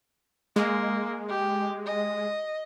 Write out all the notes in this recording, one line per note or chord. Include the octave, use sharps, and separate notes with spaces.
G#3 A#3
G4
D#5